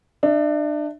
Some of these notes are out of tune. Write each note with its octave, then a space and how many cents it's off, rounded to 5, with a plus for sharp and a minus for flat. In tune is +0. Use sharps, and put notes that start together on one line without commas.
D4 +30 E5 +0